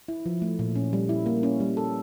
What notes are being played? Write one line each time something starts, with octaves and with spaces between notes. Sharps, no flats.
E4
F3
A3
A#2
C#4
G3
E4
A#3
C#4
G3
A4